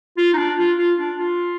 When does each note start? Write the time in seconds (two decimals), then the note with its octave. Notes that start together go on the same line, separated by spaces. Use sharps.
0.18 F4
0.34 D#4
0.38 D4
0.58 F4
0.78 F4
0.99 D4
1.19 F4